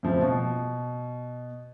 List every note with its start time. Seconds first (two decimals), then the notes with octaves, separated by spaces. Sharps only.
0.03 F2 A2 C#3 F3
0.22 B2